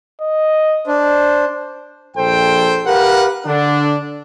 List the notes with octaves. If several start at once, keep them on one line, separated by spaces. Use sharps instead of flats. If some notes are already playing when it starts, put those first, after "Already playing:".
D#5
D4 C5
A#1 A4 C5 G5
G4 A#4 B4 F5 F#5
D3 D4